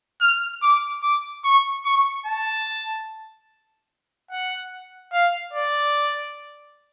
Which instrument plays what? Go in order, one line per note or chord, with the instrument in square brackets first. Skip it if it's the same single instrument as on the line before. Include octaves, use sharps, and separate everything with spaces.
[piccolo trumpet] F6
D6
D6
C#6
C#6
A5
F#5
F5
D5